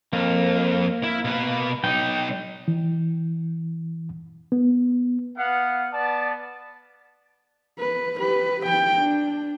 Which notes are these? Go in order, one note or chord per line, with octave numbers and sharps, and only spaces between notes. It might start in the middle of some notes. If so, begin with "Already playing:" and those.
F2 A#3
E4
B2 B4
B1 D#4 G5
E3
B3
B3 F5 F#5
B3 D5 A5
B4
G4 B4
G5
D4